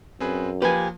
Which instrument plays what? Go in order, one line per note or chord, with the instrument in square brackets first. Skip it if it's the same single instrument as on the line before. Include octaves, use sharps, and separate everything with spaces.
[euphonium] F#2 [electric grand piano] C4 G#4 B4
[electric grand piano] F3 A#3 [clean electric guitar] G4 G#5 [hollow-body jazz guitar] B4